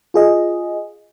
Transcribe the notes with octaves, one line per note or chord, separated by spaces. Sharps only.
F4 G#4 D#5